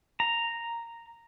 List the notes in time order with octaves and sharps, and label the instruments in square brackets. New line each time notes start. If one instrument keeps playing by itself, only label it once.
[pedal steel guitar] A#5